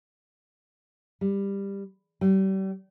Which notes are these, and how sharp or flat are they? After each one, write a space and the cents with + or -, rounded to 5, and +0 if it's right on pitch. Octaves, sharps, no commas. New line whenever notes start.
G3 +15
G3 -35